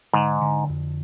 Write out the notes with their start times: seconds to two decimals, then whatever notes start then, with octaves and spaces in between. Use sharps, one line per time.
0.13 G#2 D3
0.41 D3
0.69 F2